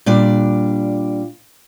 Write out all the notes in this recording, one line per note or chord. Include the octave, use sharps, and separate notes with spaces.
A#2 G3 D4 D5